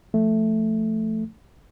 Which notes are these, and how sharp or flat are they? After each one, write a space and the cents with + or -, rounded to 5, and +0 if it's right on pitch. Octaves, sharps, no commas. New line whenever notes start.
F3 -20 A3 +0